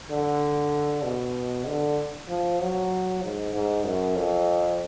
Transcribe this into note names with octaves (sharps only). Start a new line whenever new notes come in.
D3
B2
D3
F3
F#3
G#2
G#2
F#2
F2